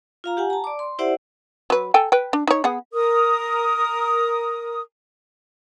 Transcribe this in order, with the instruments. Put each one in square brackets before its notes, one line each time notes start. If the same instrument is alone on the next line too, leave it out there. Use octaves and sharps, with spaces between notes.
[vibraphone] F4 F5 A#5
G4 F#5 G#5
A5 A#5
D5 D6
C6
E4 G4 C5 D5 E5 F#5
[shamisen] F#3 B4
A4 G5 G#5
B4 G5
D4
D#4 C#5
B3 G#4 F#5
[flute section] A#4 D#6